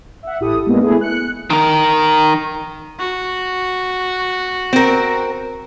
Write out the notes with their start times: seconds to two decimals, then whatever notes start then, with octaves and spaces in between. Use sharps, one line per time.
0.23 E5 F#5
0.40 A1 E4 G4 A4 D#6
0.67 G#3 A#3 B3 D4 D#4
0.81 A3 B3 E4 G#4
1.01 F#6 C#7
1.50 D#3 A#4
2.99 F#4
4.73 C4 A#4